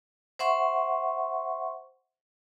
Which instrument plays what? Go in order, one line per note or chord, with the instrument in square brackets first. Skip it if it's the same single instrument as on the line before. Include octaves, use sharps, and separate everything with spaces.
[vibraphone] C5 E5 F#5 C6 C#6